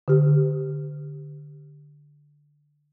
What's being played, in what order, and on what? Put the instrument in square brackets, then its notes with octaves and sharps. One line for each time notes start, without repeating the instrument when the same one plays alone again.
[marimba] D3 G4